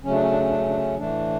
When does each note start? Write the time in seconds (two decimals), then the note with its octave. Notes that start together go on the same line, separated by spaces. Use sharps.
0.03 C#3 F#3 A3 C#4
0.13 D4
0.22 C#4
0.31 D4
0.41 C#4
0.49 D4
0.58 C#4
0.68 D4
0.77 C#4
0.97 A2 E3 A3 D4